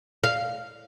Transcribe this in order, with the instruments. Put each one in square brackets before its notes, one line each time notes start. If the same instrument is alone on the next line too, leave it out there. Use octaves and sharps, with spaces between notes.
[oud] F5